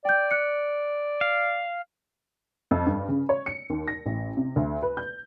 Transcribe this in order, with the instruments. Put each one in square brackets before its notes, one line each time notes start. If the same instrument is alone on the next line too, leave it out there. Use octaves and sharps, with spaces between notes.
[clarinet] D5 [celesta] G5 G6
[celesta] F#6 C#7
[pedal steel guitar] F5
[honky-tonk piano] F2
G2
C#3
C#5
C#7
D#2
A#6
A1
C3
D2
B4
G6